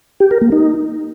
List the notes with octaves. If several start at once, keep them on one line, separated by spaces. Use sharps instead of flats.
G4
A#4
A#3
D#4